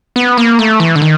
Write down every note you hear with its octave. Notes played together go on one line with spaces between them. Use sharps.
B3
A#3
A3
E3
D3
D#3